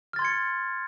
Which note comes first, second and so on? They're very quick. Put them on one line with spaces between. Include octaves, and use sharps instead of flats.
F6 A6 C6 G#6 C#7